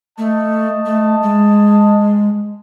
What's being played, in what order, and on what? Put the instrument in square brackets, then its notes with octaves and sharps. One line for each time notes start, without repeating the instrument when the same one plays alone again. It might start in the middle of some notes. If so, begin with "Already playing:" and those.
[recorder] A3 [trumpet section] D#5 A5
[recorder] A3
G#3